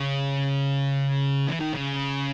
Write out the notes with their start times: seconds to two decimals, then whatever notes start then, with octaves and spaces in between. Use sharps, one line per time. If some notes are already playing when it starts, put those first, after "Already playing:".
Already playing: C#3
1.48 E3
1.60 D#3
1.73 C#3